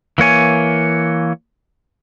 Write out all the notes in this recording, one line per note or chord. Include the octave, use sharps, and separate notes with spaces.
E3 A#3 C#5 G#5